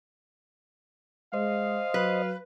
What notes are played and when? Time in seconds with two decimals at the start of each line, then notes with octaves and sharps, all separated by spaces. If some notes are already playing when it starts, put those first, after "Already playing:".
1.34 G#3 C5 D#5 F5
1.94 F#3 B4